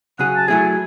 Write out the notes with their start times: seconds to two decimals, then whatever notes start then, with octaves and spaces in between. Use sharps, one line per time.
0.19 C#3 F#3 C#4 G#4 F#5
0.36 A5
0.48 F#3 A3 E4 G#4 G#5